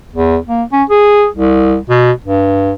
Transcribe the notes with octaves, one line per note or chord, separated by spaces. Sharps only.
E2
A#3
C#4
G#4
C2
B2
G2